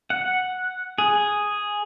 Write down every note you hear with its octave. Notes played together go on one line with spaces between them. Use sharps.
F#5
G#4